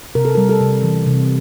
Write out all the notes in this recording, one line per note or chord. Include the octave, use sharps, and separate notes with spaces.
C3 A#4
A4
G3 A#4
A4
C3
E3
C3